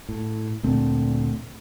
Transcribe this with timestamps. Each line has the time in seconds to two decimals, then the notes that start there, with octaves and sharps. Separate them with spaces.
0.09 A2
0.63 D2 A#2 A3 C4